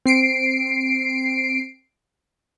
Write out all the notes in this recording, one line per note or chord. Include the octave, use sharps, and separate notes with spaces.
C4 C7 D7